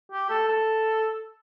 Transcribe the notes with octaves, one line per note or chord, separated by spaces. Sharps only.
G4
A4
A4